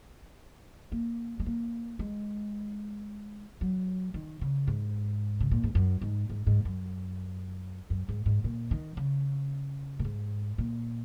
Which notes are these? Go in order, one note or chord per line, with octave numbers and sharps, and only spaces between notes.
A#3
G#3
A#3
G#3
F#3
D#3
C#3
G#2
C#3
A#2
G#2
F#2
G#2
G#2
G#2
F#2
F#2
G#2
G#2
A#2
D#3
C#3
A#2
G#2
A#2